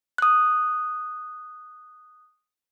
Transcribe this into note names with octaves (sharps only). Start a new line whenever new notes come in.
D#6 F#6